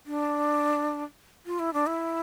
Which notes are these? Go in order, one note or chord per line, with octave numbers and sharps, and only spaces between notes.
D4
F4
E4
D4
E4